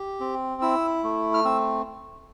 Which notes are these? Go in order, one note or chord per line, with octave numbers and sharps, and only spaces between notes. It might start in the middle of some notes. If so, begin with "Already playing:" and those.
Already playing: G4
C4
E4 E6
A3
F6
C4 E6